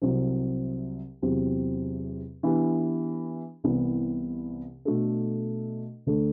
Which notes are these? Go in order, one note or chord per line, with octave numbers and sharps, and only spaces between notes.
C2 C3 F#3 C4
E2 C3 F#3 C4 G4
E3 B3 D4 G4
C2 C3 E3 B3
B2 A3 D4 F#4 A4
D2 D3 A3 D4 A4